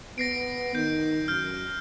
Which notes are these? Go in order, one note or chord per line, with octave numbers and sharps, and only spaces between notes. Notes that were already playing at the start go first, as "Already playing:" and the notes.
B3 A#6 C7 D7
D#3 G6 D7
F#2 F6 G6